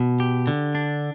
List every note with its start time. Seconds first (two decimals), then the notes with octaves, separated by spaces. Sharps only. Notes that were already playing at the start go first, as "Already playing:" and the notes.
Already playing: B2
0.20 G4
0.47 D3
0.75 D4